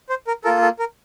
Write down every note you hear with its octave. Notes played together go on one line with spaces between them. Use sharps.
C5
A#4
A#3 F4 A4 A#4
A4
A#4